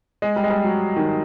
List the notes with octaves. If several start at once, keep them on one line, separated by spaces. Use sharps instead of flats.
G#3
G3
G#3
G3
F#3
D#3